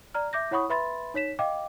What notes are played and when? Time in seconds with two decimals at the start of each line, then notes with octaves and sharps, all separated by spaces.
0.14 D5 A#5 F6
0.33 E5 D6 G6 A#6
0.51 E4 C#5 F#5 B5 C#6 D#6
0.70 B4 E5 B5 C6 A6
1.14 D#4 C#5 B6 E7
1.39 D#5 F5 G5 D6